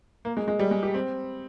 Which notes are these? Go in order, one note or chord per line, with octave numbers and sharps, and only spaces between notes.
A#3
G#3
G#3
G3
G#3
G4
C4